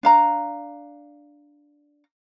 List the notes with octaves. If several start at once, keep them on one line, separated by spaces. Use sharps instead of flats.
D4 F5 A#5